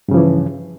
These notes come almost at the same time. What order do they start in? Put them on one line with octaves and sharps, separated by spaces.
G2 C#3 F3 E3